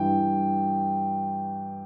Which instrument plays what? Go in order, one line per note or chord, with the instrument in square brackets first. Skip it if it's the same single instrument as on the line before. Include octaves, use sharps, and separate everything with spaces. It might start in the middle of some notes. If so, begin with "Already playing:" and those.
Already playing: [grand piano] G2 E3 G5